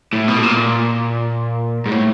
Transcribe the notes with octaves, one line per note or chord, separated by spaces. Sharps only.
A2
B2
A2
A#2
A#2
G#2
A2